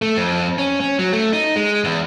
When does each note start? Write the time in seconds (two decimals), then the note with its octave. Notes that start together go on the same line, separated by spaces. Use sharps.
0.02 A3
0.17 F2
0.58 C#4
0.80 C#4
0.99 F#3
1.13 A3
1.33 D#4
1.56 G#3
1.84 E2